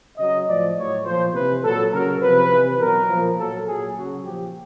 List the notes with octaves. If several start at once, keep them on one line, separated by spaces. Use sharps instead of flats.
C#3 F#3 D#5
A2 F3 D5
A2 F#3 C#5
A#2 F3 C5
C3 E3 B4
A#2 F#3 A4
C#3 F#3 A#4
C3 F3 B4
C3 E3
B2 F#3 A#4
A#2 F3
A#2 F#3 A4
A#2 F#3 G#4
C#3 F#3 F#4
A#2 F3 G4